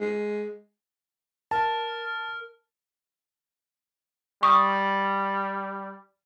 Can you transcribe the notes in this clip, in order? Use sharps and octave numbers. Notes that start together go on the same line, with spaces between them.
G#3
A#4 A5
G3 C#6 D#6